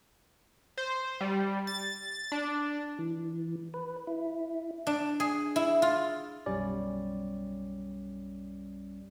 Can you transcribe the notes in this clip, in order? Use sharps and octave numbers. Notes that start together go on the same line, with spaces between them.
C5
G3
A6
D4
E3
B4
E4
D4
G#4
E4
F4
B1 F#2 G3 C#4 D5